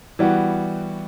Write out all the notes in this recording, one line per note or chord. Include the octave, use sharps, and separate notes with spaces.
E3 G3 B3 F#4